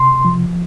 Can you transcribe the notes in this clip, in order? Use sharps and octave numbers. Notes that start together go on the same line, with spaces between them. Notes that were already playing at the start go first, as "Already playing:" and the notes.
Already playing: C3 C6
F3